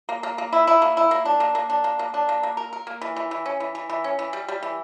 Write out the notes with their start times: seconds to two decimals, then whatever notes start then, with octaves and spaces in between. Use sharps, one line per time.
0.09 A#3
0.23 A#3
0.38 A#3
0.52 E4
0.67 E4
0.82 A#3
0.97 E4
1.11 A#3
1.25 D4
1.40 A#3
1.55 A#3
1.70 D4
1.84 A#3
1.99 A#3
2.14 D4
2.29 A#3
2.43 A#3
2.57 A#4
2.73 A#4
2.87 A#3
3.01 E3
3.16 E3
3.31 E3
3.46 C#4
3.60 E3
3.75 E3
3.89 E3
4.04 C#4
4.19 E3
4.33 G3
4.48 G3
4.63 E3